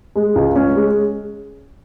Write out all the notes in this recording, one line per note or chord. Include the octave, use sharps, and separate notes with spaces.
G#3
C#2
C#4
G#3